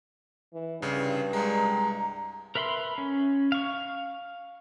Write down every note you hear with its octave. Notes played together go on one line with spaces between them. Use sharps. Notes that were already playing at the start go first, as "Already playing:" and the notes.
E3
C2 G2 C#3
C2 G#3 A#5
A#4 B4 E5 B5 C6
C#4
F5 C#6